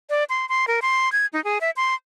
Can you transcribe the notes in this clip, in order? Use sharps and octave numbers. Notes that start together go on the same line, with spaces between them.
D5
C6
C6
A#4
C6
G#6
D#4
G#4
E5
C6